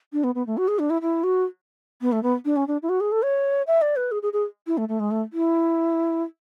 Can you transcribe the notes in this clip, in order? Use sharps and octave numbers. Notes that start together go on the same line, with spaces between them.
D4
B3
B3
A3
F#4
G#4
D4
E4
E4
F#4
B3
A3
B3
D4
C#4
D4
E4
F#4
G#4
A4
C#5
E5
D5
B4
G#4
G#4
G#4
E4
A3
A3
G#3
A3
E4